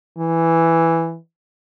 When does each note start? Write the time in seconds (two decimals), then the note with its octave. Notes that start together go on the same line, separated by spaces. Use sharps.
0.18 E3